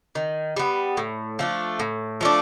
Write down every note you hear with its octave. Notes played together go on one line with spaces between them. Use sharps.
D#3
G3 B3
A2
F3 A3 D4
A2
F3 A3 D4